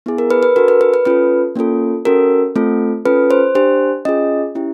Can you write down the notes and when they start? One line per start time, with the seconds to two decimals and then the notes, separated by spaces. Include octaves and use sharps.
0.06 B3 E4 G#4
0.18 A#4
0.31 B4
0.43 B4
0.56 D4 F#4 A4 A#4
0.68 B4
0.81 B4
0.94 B4
1.05 C#4 F4 A4 B4
1.56 A#3 C#4 F4 A4
2.05 C#4 F#4 A4 A#4
2.56 A3 C4 F4 A4
3.05 C#4 F4 A4 B4
3.31 C5
3.55 D4 G4 C5
4.05 C#4 F4 G#4 D#5
4.55 C#4 E4 G4